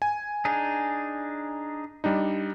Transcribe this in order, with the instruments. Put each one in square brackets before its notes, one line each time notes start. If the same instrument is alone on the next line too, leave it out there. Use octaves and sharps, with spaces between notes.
[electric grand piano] G#5
[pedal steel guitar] D4 D#4 G#4
[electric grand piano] G3 D4 D#4